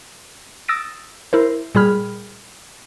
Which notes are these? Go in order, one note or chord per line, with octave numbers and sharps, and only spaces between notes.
D#6 E6 A6 A#6 D7
E4 A#4 C5
A#2 G3 G#4 B5 F6